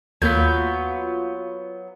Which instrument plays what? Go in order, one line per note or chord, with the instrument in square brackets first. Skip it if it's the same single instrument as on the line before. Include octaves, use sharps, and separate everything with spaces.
[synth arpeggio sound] D#2 A#3 B6 [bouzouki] F#3 B3 [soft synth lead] F4 [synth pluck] G6